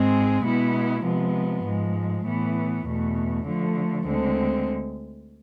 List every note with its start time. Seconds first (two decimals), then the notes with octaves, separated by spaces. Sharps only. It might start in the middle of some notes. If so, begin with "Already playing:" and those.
Already playing: G#2 G#3 C4 G#4
0.44 B2 G#3 B3 E4
1.04 C3 F3 G#3 B3
1.64 G#2 F3 G#3
2.25 A2 E3 B3
2.85 E2 B2 A3
3.46 D3 F3 A3
4.07 D2 D3 G#3 C4